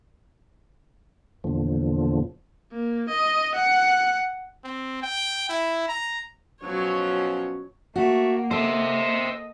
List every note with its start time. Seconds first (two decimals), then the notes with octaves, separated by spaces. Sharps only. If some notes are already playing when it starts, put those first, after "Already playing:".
1.44 E2 A#2 D3 F3
2.72 A#3
3.09 D#5
3.54 F#5
4.64 C4
5.03 G5
5.49 E4
5.88 A#5
6.62 B2 F3 F#3 C#4 C#5
7.96 A3 A#3 F#4
8.51 A4 C5 D#5 E5